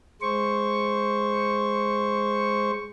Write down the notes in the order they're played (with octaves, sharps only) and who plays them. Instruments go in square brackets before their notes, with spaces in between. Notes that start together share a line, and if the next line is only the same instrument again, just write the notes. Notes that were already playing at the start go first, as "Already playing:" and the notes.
[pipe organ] G#3 C5 C#6